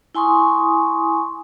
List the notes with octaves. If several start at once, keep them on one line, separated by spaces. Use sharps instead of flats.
E4 G#5 C6 C#6 D#6